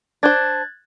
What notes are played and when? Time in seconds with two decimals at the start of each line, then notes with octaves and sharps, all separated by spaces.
0.23 D4 C5 F#6 G#6 A6